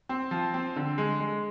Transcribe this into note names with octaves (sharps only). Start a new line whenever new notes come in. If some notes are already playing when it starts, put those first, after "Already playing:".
C4
F3
C4
D3
G#3
G#3